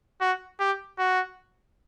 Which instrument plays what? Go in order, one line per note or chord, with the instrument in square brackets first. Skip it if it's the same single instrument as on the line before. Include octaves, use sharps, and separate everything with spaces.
[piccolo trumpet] F#4
G4
F#4